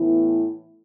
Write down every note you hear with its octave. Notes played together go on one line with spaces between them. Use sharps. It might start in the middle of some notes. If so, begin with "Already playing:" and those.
Already playing: A2 E3 B3 E4